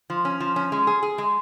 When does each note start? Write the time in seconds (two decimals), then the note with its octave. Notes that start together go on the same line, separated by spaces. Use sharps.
0.10 F3
0.25 C#4
0.40 F3
0.56 C#4
0.72 G#3
0.87 G#4
1.03 G#4
1.18 G#3